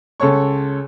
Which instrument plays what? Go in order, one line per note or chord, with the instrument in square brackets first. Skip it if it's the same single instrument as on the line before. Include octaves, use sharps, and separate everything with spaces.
[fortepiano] C#2 A4 C#5 C#6